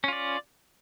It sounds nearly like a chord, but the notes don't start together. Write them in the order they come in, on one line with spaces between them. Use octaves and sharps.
C#4 F4 D5